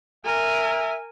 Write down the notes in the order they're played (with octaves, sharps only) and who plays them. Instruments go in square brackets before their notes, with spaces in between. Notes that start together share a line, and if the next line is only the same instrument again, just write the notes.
[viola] A#4 G#5 [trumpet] E5